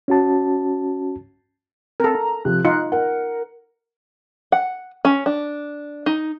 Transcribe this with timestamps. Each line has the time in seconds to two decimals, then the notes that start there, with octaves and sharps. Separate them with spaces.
0.08 C#4 F#4 A5
2.00 C4 A4 A#4
2.15 A#5
2.45 C3 F3 F#6
2.65 D#4 F4 C#7
2.92 A#4 F#5
4.52 F#5
5.05 C#4
5.26 D4
6.06 D#4